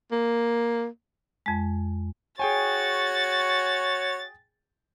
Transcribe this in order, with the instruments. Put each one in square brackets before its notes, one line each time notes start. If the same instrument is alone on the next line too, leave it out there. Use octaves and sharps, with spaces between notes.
[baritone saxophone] A#3
[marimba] F2 G#3
[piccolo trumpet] F#4 [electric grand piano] G#4 G5 G#5 [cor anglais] C#5 [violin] A6